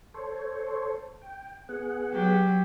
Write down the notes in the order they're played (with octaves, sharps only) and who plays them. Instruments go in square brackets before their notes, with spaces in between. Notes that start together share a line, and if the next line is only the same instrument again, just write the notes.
[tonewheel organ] A4 C5 C#5
G5
B3 G#4 F#5
[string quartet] F#3 G4